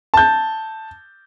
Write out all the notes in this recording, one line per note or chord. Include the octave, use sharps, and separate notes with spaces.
A5 G6